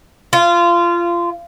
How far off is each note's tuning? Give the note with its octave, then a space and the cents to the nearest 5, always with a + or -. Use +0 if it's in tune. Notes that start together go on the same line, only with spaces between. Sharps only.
F4 -20